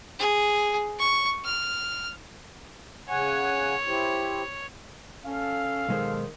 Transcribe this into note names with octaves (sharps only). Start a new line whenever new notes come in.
G#4
C#6
F6
C#3 C#5 F#5 G#5
E4 G4 C5
C#4 A4 F5
B1 D#3 G#3 C5